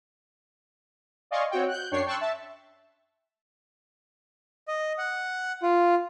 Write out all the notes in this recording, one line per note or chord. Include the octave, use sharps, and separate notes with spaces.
D5 D#5 F5 G#5 C6 C#6
C4 F#4 C#5 G5
F#6 G6
F#2 D4 C#5 G5 C#6 C7
G5 A5 C6 C#6 E6 F#6
E5 A5
D#5
F#5
F4